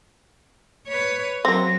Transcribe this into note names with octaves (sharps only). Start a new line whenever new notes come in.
B4 C#5
F#3 A#3 C4 A#6